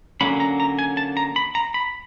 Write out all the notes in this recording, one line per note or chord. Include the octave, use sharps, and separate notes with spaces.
D3 F#3 A#3 C#4 B5
A#5
A#5
G#5
A5
A#5
B5
A#5
B5